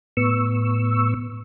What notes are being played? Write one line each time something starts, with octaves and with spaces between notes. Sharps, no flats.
A2 B3 C#6 E6